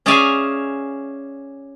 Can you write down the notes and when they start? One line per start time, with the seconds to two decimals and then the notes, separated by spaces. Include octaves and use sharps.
0.06 C#4 G#4 D5 E5 F5 G#5